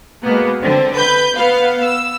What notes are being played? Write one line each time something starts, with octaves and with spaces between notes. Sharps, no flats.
B2 G#3 A#3 B3
D3 C4
B4 B5 G6
B3 F5
E6